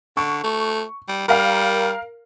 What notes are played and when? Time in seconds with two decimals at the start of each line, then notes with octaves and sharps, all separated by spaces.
0.17 D3 C#6
0.44 A3
1.08 G3
1.28 G3 A#4 F5